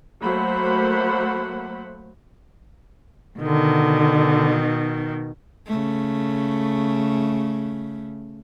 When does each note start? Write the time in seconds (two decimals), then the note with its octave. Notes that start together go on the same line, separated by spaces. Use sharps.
0.22 F#3 A3 A#3 C5 F#5 B5
3.38 B2 D3 D#3
5.67 C#3 A3